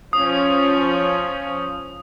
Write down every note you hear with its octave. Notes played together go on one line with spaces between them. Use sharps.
F3 C#4 D#6